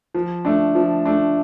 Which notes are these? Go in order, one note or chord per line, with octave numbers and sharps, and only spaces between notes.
F3
A3 D4
F3
A3 D4